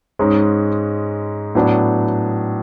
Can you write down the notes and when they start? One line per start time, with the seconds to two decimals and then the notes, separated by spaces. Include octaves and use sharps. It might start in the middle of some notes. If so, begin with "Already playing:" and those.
0.19 G#2 G#3 C#4
1.55 A2 F#3 B3 D4